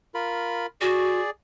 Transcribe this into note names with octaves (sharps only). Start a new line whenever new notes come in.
F4 A#4 B5
F#4 G#4 D5